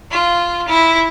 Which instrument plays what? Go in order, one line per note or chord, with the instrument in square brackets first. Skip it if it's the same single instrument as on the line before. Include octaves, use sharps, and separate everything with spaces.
[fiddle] F4
E4